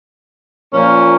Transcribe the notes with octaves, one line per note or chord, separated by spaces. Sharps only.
A#2 F3 A#3 C#4